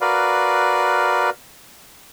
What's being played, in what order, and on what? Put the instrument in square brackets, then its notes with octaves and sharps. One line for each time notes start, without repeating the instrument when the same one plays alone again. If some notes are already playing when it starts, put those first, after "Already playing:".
[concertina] F#4 A#4 B4 D5 F5